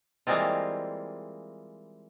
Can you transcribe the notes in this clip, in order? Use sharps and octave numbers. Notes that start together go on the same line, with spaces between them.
E3 G3 G#3 A#3 C4 F4